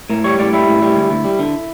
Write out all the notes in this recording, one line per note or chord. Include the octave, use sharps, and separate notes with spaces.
A2 A#4
G3 C#5
A2 D5
G3 E4
A2
G3
D2
D2
G3
D3